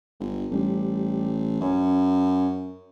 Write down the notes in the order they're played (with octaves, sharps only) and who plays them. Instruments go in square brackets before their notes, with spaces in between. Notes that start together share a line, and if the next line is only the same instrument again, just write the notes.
[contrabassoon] G1
[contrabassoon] A1 [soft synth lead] G3
[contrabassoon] F#2 [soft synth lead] C#4